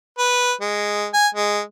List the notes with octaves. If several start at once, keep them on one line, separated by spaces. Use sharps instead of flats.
B4
G#3
G#5
G#3